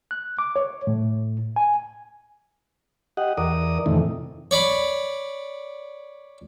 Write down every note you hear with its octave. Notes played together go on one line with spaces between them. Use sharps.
F#6
D6
C#5
A2
G#5
G4 D#5 F#5
E2 A#4 D5 D#6
F2 A2 C3 D#3 E3
C#5 D5 B5